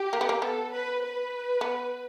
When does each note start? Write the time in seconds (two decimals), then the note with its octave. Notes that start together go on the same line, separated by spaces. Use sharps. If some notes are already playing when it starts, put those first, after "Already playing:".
Already playing: G4
0.13 A#3
0.21 B3
0.29 A#3
0.42 B3 A4
0.72 B4
1.02 B4
1.61 B3